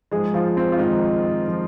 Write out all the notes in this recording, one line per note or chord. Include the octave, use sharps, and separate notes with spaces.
G#2 F3 G#3 G#4
F3 F4
C4
F4
G#2 D#3 F3 D#4
F3